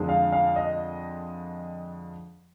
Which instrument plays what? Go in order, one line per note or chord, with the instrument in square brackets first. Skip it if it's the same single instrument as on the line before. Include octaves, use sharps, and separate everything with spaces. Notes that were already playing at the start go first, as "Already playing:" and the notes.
Already playing: [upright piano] F2 D3 G#3
F5
F5
D#5